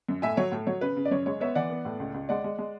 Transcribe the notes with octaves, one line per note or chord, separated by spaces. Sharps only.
F#2
A2 E5 G#5
F#3 C#5
A2
F#3 C#5
C#3 B4
C#3
D5
F#2 C#5
G#3 C#5
B3 C#5 E5
E3 D5 F#5
B3
A2
C#2
C#2
G#3 D5 F#5
G#3
G#3